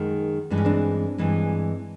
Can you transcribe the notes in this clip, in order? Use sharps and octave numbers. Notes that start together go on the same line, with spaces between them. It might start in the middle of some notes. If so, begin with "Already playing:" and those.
Already playing: F#2 D#3 G#3
G2 E3 G#3 D4
C#4
C4 D4
G2 E3 G#3